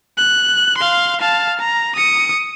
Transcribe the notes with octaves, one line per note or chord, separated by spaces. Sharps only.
F#6
F5 C6
F5 A5
A#5
D#6 C#7